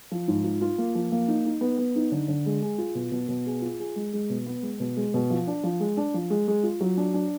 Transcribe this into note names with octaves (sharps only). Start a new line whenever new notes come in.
F3
G#2
F4
F4
A#3
F3
A#3
D#4
D#4
B3
B3
D#4
D3
D3
G#3
G#4
F4
B2
B2
B2
G#4
F4
G#4
G#3
G#3
B2
B3
G#3
B2
G#3
B2
F3
D4
F3
G#3
D4
F3
G#3
G#3
F4
F#3
D4
D4